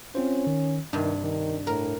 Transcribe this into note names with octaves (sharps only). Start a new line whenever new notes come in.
C4 C#4 F4 C5
D#3
G2 C3 D#3 D4
D#3
A2 A#4